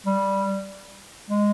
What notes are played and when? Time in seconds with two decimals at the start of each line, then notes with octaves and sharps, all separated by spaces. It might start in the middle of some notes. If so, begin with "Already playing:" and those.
0.06 G3
1.30 G#3